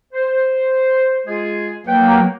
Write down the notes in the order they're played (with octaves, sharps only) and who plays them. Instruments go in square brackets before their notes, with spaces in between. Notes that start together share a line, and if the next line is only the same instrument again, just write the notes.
[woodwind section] C5
G#3 F4 G#4
[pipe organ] F#3 A#3 [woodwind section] B4 C#5 G5